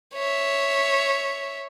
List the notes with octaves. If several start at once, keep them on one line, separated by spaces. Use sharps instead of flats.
C#5 E5